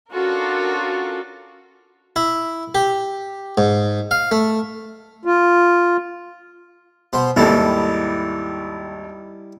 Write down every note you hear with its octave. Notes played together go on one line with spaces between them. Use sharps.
C#4 D4 F4 F#4 A4 A#4
E4
G4
G#2
F5
A3
F4
B2 C5
G#1 D#2 G3 E4 A4